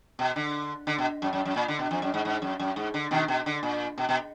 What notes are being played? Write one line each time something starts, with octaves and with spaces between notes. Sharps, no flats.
B2
D3
D3
B2
F#2
F#2
F#2
A#2
D3
B2
F2
F#2
G#2
G#2
F#2
F#2
G#2
D3
B2 D#3
B2
D3
A#2
B2
B2